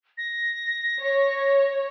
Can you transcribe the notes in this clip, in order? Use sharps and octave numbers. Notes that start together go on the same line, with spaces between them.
A#6
C#5